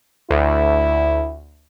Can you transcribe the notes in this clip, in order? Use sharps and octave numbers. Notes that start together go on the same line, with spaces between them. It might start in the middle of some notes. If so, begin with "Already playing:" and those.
D2 E4